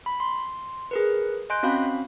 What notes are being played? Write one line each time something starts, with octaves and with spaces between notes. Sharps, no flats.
B5
C6
G#4 A#4 B4
D#5 G#5 C6 F#6 G6 D7
C4 C#4 F#4 F5 B5